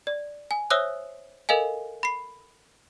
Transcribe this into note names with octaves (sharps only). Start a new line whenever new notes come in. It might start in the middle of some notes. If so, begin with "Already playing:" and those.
D5
G#5
C5 C#5 E5 D#6 E6 F#6
A4 A#4 D#5 F5 G#5
B5 C7